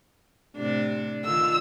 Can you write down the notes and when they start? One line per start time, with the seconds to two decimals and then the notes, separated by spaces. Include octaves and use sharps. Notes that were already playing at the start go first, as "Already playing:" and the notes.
0.57 A2 C3 D4
1.24 D3 D#3 F4 E6